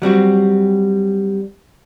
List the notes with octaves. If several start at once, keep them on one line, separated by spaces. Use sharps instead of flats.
F#3 G3 C4 F#4